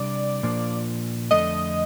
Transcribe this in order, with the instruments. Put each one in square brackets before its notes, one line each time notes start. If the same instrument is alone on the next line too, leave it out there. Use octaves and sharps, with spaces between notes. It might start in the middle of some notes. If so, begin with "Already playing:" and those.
Already playing: [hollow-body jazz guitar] C3 G3 D4 [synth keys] D5
[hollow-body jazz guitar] A#2 F3 A#3 D4
[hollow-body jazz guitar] F2 D3 A3 D4 [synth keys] D#5